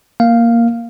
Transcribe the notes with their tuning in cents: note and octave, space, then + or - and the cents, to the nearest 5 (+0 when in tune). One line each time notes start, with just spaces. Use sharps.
A#3 +0 F5 +0